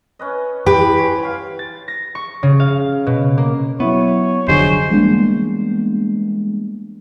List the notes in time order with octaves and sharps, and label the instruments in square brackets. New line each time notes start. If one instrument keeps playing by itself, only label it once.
[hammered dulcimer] C#4 B4 D#5
[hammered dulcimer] E3 [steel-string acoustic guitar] G4 B4
[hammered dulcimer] C#5 G#5 C6
F#3 F5
[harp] A6
A#6
C#6
C#3
F5
B2
A#3
[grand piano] F#3 E4 [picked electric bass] B3 [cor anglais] C#5
[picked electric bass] F1 D3 F#3 [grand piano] G#4 D#5 G#5 [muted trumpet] C5
[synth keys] E3 G3 G#3 A#3 B3 D4